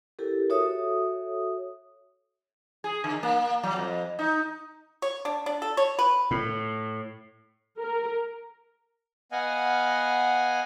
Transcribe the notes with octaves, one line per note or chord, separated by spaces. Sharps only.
E4 G4 A4 A#4
F#4 A4 C#5 E5 D#6
G#4
D3
A#3
F#3
F2
D#4
C#5
D4
D4
A4
C#5
B4
A2
A#4
B3 D#5 F5 F#5 G#5